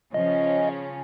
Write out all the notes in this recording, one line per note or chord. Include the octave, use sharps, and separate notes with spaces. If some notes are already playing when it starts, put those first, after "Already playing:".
C#3 F3 C#4 D#5